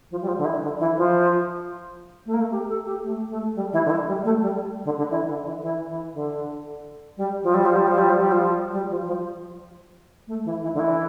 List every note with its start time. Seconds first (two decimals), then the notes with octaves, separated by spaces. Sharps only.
0.11 F3
0.22 G3
0.28 F3
0.37 D3
0.45 E3
0.62 D3
0.79 E3
0.97 F3
2.26 A3
2.33 A#3
2.41 A3
2.51 G4
2.69 A4
2.86 G4
3.04 A3
3.30 A3
3.55 G3
3.73 E3
3.85 D3
3.90 E3
4.07 G3
4.24 A3
4.42 G3
4.85 D3
4.97 D3
5.10 E3
5.28 D3
5.45 E3
5.62 E3
5.88 E3
6.13 D3
7.17 G3
7.43 F3
7.54 G3
7.65 F3
7.76 G3
7.87 F3
7.98 G3
8.09 F3
8.20 G3
8.31 F3
8.72 G3
8.90 F3
9.06 F3
10.27 A3
10.45 E3
10.62 E3
10.74 D3
10.79 E3